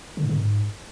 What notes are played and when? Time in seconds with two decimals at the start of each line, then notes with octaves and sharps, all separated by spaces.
0.17 D3
0.23 A2
0.29 D3
0.35 G#2